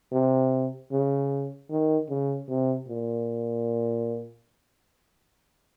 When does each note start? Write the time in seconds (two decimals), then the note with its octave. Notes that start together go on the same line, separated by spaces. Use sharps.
0.12 C3
0.91 C#3
1.70 D#3
2.09 C#3
2.48 C3
2.88 A#2